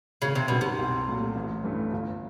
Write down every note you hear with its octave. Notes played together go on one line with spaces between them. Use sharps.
G#1 C#3
C3
F#2 B2 D#3 G3 B3
C3
C2
A#2 F#3 A3
A1
G2 E3 A3 C#4
G1